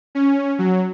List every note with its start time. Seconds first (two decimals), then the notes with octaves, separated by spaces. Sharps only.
0.15 C#4
0.59 F#3